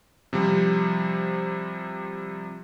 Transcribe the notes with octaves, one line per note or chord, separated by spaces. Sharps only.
C3 F3 G3